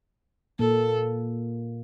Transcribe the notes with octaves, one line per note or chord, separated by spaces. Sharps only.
A#2 A#3 A4